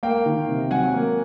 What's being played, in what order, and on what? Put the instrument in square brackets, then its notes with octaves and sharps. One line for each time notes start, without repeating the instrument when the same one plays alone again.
[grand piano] A#3 F5 G5
D#3
C3
F#3 F#5 G#5
A#3